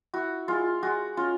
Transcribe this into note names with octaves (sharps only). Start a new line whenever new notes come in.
E4 F#4
G#3 F4
G#3 F#4
C#4 F4